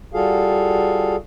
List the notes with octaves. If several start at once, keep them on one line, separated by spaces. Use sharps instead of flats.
G3 F4 F#4 G#4 A4 F5